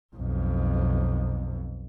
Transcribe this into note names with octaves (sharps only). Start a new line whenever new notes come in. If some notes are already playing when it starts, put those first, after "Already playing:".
B1 F2